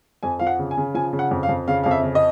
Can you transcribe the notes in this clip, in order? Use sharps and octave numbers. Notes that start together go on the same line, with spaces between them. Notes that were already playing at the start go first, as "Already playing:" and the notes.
F2 G#5
F3 F5
F#5
C#3
G#5
C#3
F3 G#5
C#3
F#5
F2
F5
F2
C#3 F5
F2 F5
E5
C#3
D#5